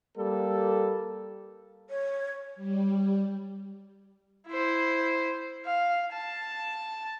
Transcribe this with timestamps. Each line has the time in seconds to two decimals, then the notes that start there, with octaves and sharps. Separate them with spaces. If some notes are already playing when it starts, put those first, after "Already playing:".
0.18 G3 A#3 A4
1.90 C#5
2.56 G3
4.47 E4 C5
5.65 F5
6.13 A5